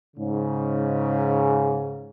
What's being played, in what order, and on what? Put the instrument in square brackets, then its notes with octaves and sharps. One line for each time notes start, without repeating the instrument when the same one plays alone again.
[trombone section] G#2 C#3